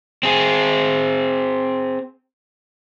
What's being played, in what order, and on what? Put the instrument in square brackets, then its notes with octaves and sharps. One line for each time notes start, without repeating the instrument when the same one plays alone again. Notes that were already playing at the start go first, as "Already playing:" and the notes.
[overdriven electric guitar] C4 G#4